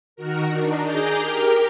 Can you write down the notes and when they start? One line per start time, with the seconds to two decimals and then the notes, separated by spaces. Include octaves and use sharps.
0.16 D#3 F#4 A#4
0.48 D4 D#4
0.83 G#4 A#5 D6 G6
1.17 G4 A#4